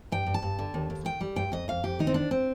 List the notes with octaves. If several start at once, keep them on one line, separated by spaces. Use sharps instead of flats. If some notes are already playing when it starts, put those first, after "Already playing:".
G2 G5
G2
A5
G2
D3
D#2
D#2
D#3 G5
G3
G2 G5
F2 D#5
F2 F5
F2 G4
D#3 D#4
C4
F2 D4
C4